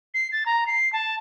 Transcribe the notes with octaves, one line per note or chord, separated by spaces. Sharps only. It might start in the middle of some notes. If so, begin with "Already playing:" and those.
C7
A6
A#5
C7
A5